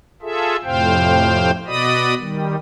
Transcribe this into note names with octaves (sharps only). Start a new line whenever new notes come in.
F4 G#4 A4 E5
F2 A2 C3 C5 F5 G5
B2 F#4 D5 D#5 B5 D#6
D#3 G3